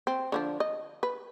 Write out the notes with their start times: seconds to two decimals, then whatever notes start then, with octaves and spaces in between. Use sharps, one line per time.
0.07 C4
0.32 D3 F3 D4
0.60 D#5
1.03 B4